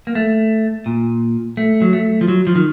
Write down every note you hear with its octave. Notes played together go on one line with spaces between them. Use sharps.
A#3
A3
A#2
A3
F#3
A3
F3
F#3
F3
D#3